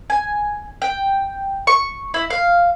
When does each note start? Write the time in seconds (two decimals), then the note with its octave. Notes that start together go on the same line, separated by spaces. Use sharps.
0.10 G#5
0.82 G5
1.67 C#6
2.14 E4
2.30 F5